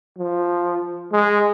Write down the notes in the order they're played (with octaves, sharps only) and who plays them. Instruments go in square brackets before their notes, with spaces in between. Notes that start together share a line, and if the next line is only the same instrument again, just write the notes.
[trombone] F3
G#3